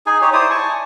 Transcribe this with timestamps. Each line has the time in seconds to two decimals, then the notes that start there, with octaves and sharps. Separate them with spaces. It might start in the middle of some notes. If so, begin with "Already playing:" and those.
0.06 D#4 G#4 G#5
0.22 D#4 G4 C#5
0.33 E4 C5 D5 D#6
0.50 G#5 A5 C#6